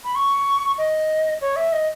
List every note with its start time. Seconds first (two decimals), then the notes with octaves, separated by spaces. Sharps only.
0.04 B5
0.15 C#6
0.78 D#5
1.41 C#5
1.56 E5
1.72 D#5